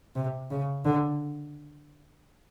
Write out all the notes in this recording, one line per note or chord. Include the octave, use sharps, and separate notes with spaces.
C3
C#3
D3